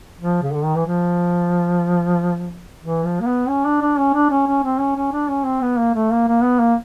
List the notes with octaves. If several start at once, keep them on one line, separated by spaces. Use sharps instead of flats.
F3
C#3
D3
D#3
E3
F3
E3
F3
A#3
B3
C#4
D4
D4
C#4
D4
C#4
C#4
C4
C#4
C#4
D4
C#4
C4
B3
A#3
A3
A#3
A#3
B3
A#3